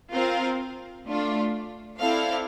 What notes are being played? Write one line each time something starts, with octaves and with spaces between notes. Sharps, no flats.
C4 F4 A#4 F5
A3 D4 F4
C4 E4 A4 D5 F5